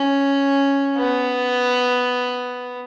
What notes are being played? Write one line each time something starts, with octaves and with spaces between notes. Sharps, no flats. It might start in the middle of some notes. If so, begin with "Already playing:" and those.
Already playing: C#4
B3